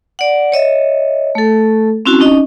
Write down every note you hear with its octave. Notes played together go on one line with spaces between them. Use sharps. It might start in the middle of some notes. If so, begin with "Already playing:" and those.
D5 F#5
C#5 D#5 E5
A3 A4
C4 C#4 E4 F#4
C#4 D#4 D#5